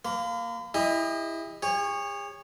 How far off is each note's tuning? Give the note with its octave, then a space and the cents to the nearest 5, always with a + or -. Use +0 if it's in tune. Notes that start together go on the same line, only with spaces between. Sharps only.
A#3 +0 B5 +45
E4 +0 G4 +45 D#5 +0
G#4 -45 C#5 +0